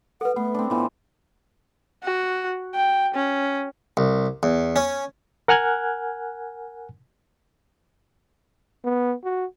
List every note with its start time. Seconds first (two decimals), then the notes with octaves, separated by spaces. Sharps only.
0.21 A4 B4 F#5
0.36 A3 B3 F#5
0.54 C4 D4
0.70 A2 E3 F3 B3
2.03 F#4
2.75 G5
3.15 C#4
3.97 C2
4.43 E2
4.76 C#4
5.48 A#4 F#5 G#5 F6 F#6 G#6
8.85 B3
9.24 F#4